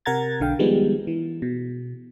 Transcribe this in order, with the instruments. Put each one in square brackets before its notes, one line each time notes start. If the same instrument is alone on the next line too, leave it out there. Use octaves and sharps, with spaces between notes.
[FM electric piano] C3 A#4 F#5 A#5 G#6 A6
B1 D3 F5 G5
D#3 F3 G3 G#3 B3
E3
B2